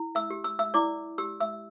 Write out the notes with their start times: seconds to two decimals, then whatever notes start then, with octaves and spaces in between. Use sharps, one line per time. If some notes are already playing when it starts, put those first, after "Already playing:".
Already playing: E4
0.15 E5 E6
0.30 G4
0.44 E6
0.59 E5 E6
0.74 E4 D5 D6
1.18 G4 E6
1.40 E5 E6